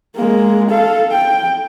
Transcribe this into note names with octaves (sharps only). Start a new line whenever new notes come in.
G#3 A#3
A4 F5
G5